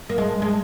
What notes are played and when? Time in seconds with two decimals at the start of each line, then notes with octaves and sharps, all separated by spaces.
0.10 A#3
0.18 G#3
0.42 G#3